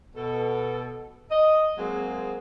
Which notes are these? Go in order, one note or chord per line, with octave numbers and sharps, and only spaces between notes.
B2 A4
D#5
F#3 G#3 A#3 C4 G#4